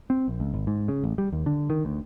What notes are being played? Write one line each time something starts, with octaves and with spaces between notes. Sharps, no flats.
C4
A#1
C#2
G#1
G#2
C#3
A1
G3
D#2
D3
D#3
D2